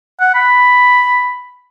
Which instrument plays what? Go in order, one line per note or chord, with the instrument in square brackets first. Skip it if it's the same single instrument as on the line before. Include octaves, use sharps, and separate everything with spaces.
[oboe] F#5
B5